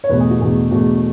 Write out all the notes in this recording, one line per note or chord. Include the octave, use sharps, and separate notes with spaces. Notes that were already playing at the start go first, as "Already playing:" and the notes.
C#5
E2 B2 A3 B4
G#4
F#4
E2 B2 A3 G#4
E2 B2 A3 F#4